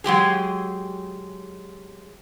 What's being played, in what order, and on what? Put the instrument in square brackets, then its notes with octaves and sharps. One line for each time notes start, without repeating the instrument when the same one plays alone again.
[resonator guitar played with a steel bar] F#3 G#3 G4 G#4